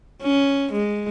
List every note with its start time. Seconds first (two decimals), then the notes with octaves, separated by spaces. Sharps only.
0.23 C#4
0.73 G#3